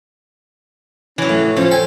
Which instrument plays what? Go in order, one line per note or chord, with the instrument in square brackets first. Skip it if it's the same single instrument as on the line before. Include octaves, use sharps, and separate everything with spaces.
[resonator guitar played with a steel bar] E3 F#3 [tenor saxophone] C#4
[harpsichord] A2
[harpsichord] F3 [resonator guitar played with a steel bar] C#4 [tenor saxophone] C5
[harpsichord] A4 G5 G#5